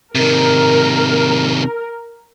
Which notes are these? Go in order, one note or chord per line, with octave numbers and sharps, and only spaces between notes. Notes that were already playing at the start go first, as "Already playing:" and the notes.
C3 D#3 A#4